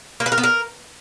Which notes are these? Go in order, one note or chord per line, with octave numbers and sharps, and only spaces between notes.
A#3
B4
A#4
B3
A#4